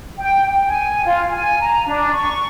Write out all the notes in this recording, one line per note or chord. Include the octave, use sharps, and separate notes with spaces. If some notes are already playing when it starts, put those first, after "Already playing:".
G5
G#5
F4
G#5
A#5
D4
C#6